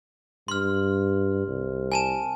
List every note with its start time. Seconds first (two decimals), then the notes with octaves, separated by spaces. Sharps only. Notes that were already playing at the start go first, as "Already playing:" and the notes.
0.48 G2 C6 F6
1.48 C2
1.92 G#5 A5 E7